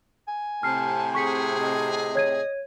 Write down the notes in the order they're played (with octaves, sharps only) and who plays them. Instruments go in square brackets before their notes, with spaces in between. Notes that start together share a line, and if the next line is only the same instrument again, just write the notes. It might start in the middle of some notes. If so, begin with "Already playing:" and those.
[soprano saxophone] G#5
[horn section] A2 C3 [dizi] A5 [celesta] F6 C7
[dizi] G#4 [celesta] C#6 B6 C#7
[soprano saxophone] D#5
[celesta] C#5 G#6 D#7